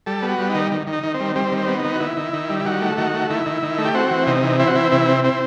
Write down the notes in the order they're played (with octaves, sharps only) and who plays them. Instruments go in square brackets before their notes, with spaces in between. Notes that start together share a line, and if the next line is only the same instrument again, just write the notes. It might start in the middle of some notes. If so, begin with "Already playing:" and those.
[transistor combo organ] G3 A4
B3
F#4
G3
D#4
D#3
D#3
D#3
D#4
D#3
C4
G3
G3 C4
D#3
C4
B3
D#4
D#3
F#4
D#3 E4
D#3
D#3
G3
E4
D#3 F#4
A3
D#3 F#4
A3
D#3 E4
D#3
D#3
A3
G4
C4 F#4
E3
C3 D#4
E3
C4 E4
F#4
E3 E4
C3 E4
C4
C4 E4